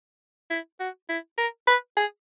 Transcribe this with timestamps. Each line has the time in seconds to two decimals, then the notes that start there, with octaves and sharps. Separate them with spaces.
0.50 E4
0.80 F#4
1.09 E4
1.38 A#4
1.67 B4
1.97 G#4